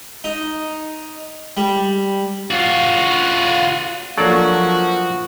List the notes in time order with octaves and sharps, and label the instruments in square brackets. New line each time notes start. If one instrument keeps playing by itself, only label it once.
[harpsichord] D#4
G3
[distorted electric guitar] F4 F#4
[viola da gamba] F3 [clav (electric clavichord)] F#3 D5 [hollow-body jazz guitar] A#3 D4 A4 [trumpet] F#4